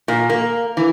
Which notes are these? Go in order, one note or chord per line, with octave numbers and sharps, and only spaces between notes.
A#2
A#3
E3